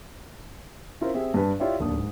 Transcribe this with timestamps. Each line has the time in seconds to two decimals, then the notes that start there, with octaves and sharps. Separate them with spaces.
1.01 C#4 E4 F4 A#4 C5
1.14 C4 G4 G#4 E5
1.34 G2 D4 B4 A5
1.60 E4 F4 G4 C#5 D5 E5
1.79 D1 D#2 D4 D#6
1.97 G#2